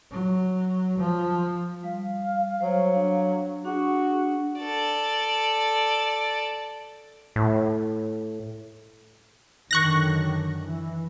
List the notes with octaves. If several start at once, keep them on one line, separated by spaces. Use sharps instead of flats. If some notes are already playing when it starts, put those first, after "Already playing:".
F#3
F3
G3 F5
F#3 C5 C#5
D4
D4 F#4 G#4 F#5
A4 D5
A2
F#2 D3 D#3 C#6 F#6 A#6
E3